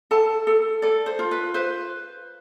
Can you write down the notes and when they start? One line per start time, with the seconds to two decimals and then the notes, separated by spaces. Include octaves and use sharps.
0.11 A4 A5
0.47 A4
0.82 A4 D5
1.06 C5
1.19 F4
1.31 B4
1.54 B4 C5